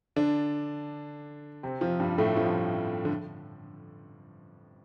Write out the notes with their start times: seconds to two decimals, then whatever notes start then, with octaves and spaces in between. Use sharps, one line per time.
0.16 D3 D4
1.63 C3 C4
1.81 F2 F3
2.00 G2 G3
2.18 A2 A3
2.36 F2 F3
3.05 D3